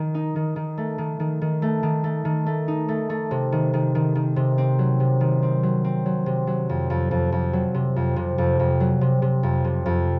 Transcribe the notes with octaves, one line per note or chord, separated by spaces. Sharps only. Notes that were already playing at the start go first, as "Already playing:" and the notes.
Already playing: D#3
D#4
D#3
D#3
A3
D#3
D#3
D#3
A3
D#3
A3
D#3
A3
D#4
A3
A3
C3
D#3
D#3
D#3
D#3
C3
C4
F#3
C3
D#3
C4
F#3
C4
F#3
C3
F#3
F2
F2
F2
F2
F#3
C3
F2
C3
F2
F2
F#3
C3
C3
F2
C3
F2